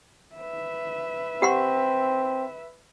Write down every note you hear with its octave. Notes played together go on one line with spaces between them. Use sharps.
B4 E5
C4 G4 F#5 C6